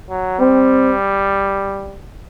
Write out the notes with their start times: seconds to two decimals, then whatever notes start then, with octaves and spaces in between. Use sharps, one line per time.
0.09 F#3
0.39 G3 C4